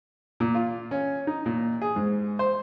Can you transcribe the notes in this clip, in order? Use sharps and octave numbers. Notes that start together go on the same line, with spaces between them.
A#2
F4
C#4
D#4
A#2
G#4
G#2
C5